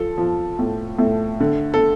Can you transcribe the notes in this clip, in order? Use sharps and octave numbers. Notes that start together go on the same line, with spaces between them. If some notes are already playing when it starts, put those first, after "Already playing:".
Already playing: F3 A4
F3
A2
A2
D3
A4